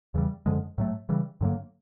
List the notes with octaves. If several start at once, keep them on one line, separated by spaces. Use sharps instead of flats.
E2 C#3 E3 G3
F#2 D3 F3 G#3
A2 F#3 A3
C#3 E3 G3
G2 D3 F#3 A#3